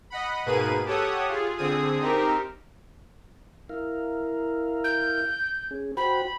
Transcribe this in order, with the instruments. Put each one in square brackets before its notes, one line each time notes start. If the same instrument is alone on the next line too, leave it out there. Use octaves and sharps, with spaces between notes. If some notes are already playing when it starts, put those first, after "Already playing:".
[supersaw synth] D#5 F#5 B5
G#2 B2 A#3 G#4 B4 D#7
G4 A4 C#5 F#5 D#6
F4 G#4
D3 C4 G#4 D#6
C4 D#4 G4 A#4
[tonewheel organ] E4 A#4 F5
[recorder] G6
[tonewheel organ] C#4 G#4
[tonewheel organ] F#4 C5 G5 [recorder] B5